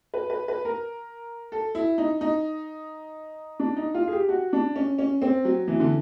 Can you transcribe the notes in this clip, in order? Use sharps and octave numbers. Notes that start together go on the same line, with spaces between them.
B4
B4
B4
A#4
A4
E4
D#4
D#4
D4
D#4
F4
G#4
G4
F#4
D4
C#4
C#4
C4
F#3
E3
D3